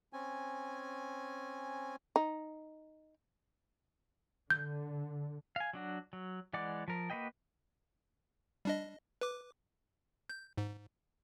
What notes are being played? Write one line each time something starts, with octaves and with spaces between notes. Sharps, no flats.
C4 C#4 G#5
D#4
D3 G6
F5 G#5
F#3 D4 F#4
F#3
E3 G#3 D5 F#5 D6
F3 A#4
A#3 F#4 B4 D#5 G5
G3 D4 D#5
B4 D6
G6
G#2